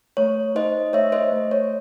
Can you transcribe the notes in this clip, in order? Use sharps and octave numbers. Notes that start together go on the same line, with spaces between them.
A3 C#5
D#4 C5 D#5
A3 C#5 E5
C5 D#5
A3
C#5